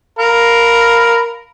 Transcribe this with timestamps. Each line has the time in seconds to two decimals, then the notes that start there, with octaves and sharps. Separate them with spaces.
0.19 A#4 F5 B5